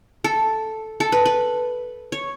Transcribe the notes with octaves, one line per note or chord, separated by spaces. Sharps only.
A4
A4
B4
B4
C#5